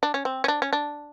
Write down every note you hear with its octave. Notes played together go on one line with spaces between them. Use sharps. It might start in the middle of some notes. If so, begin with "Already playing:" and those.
D4
C#4
C4
C#4
D4
C#4
D4